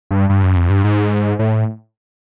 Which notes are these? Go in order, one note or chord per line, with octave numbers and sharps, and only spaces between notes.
G2
G2
F#2
F2
G2
G#2
A2